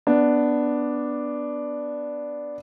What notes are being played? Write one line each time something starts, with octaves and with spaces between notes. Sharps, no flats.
B3 D4